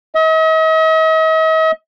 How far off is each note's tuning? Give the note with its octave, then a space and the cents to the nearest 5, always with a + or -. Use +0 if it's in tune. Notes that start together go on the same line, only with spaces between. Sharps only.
D#5 +45